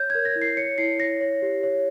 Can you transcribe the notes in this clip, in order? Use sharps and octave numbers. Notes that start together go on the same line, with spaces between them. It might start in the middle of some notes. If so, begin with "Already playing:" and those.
Already playing: C#5 G6
A#4 G#6
A#6
E4
C7
C#5 C#7
E4 C7
C#5 A#6
C#5
G4
C#5